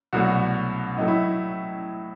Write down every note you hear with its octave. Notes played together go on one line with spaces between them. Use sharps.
C2 B2 F#3 A3 F#4
A2 F#3 A3 D#4
E4